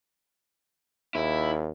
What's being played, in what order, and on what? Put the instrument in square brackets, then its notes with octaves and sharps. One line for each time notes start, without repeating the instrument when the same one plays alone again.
[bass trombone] D#2 [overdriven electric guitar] E4